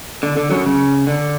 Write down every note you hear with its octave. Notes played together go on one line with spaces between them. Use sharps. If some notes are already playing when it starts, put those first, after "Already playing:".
D3
D3
F#2 F#3
C#3
D3